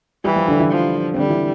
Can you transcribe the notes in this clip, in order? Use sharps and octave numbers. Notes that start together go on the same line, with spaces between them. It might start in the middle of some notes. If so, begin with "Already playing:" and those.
E3 G3 G4
F3 F4
D3 D4
E3 E4
F3
C4
D3 G3 D4
E3 E4